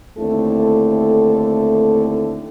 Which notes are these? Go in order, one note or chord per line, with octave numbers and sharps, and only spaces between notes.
D#2 D3 A3 C4 E4 A4